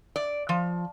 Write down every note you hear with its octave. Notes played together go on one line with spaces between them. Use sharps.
D5
F3